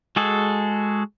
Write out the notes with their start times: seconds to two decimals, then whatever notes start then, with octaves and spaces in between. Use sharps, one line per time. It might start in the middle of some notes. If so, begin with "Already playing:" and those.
0.16 G#3 F#4 G#4 A4